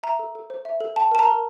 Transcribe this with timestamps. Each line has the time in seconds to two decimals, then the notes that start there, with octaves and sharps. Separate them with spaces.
0.03 E5 A#5
0.19 A4
0.35 A4
0.50 C5
0.65 E5
0.80 A4
0.96 G5 A5
1.12 A#4 A5
1.19 A#5
1.27 A#4